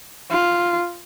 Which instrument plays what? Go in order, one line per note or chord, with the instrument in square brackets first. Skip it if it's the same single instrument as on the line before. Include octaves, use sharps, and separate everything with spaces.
[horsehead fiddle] F4